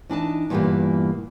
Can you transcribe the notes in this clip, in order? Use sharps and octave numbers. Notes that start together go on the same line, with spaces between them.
E3 D4 D#4 A5
E2 G2 A#2 E3 G3 A#3